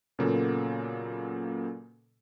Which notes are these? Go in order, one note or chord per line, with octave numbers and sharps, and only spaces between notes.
A#2 C#3 F#3 A#3 B3 A4